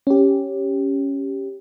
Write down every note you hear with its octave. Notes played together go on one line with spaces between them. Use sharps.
C#4 G4